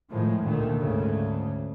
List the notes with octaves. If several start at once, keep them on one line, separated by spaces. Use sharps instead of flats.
A2 D#3 F3 G#3
D2 A#2 D3 D#3 A3
D2 G#2 C#3 A3